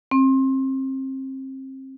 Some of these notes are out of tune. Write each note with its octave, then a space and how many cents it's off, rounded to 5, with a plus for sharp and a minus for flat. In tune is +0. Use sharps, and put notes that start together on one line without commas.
C4 +30